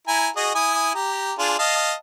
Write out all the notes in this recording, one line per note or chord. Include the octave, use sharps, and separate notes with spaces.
E4 G#5 A#5
F#4 G#4 D#5
E4 G#5 D#6
G4 A#5
D4 F4 G#4
D#5 F5 A5